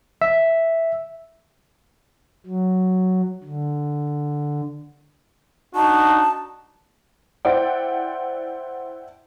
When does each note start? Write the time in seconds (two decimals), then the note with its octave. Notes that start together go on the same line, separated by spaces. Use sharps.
0.22 E5
2.46 F#3
3.44 D3
5.75 D4 D#4 F#4 A5
7.45 E4 C5 D5 F#5 G5